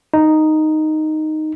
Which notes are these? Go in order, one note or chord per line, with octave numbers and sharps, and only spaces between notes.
D#4